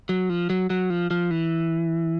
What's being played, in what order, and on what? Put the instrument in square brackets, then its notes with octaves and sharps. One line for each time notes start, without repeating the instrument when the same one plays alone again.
[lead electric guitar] F#3
F3
F#3
F#3
F3
F3
E3